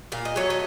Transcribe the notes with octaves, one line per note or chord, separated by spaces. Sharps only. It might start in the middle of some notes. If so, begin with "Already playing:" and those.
A#2 F5
D#5
F#3 A3 C#5
D#5